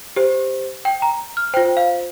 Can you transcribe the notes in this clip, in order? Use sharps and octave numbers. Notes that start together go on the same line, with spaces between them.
G4 C5
G5
A#5
F6
F4 C5 G5
F5